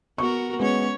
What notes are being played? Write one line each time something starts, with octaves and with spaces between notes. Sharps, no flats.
B3 F#4 A#4 C#6
G#3 B3 C#4 C#5